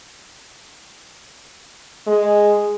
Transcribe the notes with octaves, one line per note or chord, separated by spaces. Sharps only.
G#3